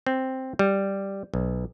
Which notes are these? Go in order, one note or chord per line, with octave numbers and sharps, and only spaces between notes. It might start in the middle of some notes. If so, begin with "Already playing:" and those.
C4
G3
B1